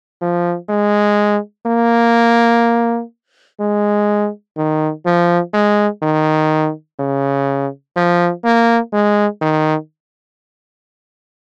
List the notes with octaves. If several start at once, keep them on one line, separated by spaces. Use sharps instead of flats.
F3
G#3
A#3
G#3
D#3
F3
G#3
D#3
C#3
F3
A#3
G#3
D#3